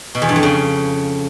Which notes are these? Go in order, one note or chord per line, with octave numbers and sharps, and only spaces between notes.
B2
E2
G2
F2
C#3